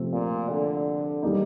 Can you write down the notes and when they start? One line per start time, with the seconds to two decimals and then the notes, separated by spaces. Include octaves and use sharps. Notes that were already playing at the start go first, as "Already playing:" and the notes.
Already playing: C3 F3 A3 C4
0.13 A#2
0.49 D3
1.23 E3 G3 A#3 D#4